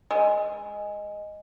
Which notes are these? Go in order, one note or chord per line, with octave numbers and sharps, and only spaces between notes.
G#3